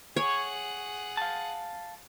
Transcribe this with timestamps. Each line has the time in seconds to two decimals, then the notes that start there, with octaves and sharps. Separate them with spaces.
0.16 G#4 C#5 F#5
1.17 F5 A5